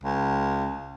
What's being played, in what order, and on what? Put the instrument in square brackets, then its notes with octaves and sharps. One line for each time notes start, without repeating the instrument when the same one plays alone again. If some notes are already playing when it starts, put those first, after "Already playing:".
[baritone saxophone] C#2